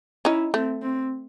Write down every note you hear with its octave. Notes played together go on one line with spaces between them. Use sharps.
C#4 D#4 E4
A3 C4
C4